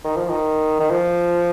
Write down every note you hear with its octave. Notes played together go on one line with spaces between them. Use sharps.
D#3
F3
D#3
D#3
F3